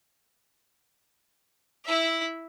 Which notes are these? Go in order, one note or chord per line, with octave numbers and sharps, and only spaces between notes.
E4 E5